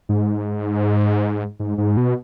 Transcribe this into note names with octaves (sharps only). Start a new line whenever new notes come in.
G#2
G#2
G#2
B2